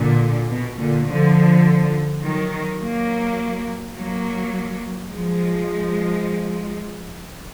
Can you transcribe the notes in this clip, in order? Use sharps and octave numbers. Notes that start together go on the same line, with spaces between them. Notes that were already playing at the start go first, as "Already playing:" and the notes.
Already playing: A#2 D3
B2
A#2 D3
D3 F3
D#3 F#3
F#3 A#3
F#3 A#3
F3 G#3